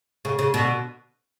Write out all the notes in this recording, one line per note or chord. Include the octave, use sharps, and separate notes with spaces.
C#3
C#3
B2 D3